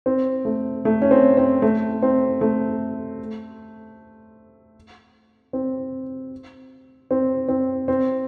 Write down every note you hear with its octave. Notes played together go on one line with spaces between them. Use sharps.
C4
A3
A3
C#4
C4
C4
A3
C4
A3
C4
C4
C4
C4